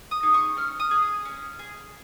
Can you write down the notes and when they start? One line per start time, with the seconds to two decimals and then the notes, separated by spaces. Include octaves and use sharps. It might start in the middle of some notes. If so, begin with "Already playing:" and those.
0.11 D#6
0.23 D#4 G#4
0.34 C#6
0.57 C#4 F6
0.80 D#6
0.91 G#4
1.25 C#4
1.59 G#4